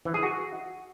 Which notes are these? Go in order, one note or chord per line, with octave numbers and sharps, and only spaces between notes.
E3
G#4
F#4